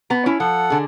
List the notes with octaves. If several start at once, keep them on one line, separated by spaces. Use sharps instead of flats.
B3 A#5
C#4 E4
F3 A4 F#5
D3 G#4